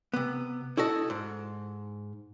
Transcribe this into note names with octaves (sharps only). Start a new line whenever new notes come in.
C3 B3
E4 F#4 A4 D#5
G#2